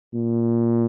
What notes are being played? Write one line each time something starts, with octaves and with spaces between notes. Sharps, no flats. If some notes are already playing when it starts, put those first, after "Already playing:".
A#2